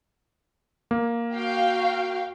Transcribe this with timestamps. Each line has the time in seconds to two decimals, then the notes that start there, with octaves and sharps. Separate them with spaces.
0.91 A#3
1.34 F#4 F5 G5